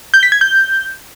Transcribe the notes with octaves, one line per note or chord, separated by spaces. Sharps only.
G6
B6
G#6
G6